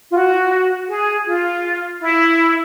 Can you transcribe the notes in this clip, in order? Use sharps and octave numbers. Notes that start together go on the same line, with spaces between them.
F4
F#4
G#4
F4
E4